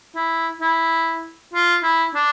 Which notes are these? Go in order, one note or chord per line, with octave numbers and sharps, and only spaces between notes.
E4
E4
F4
E4
D4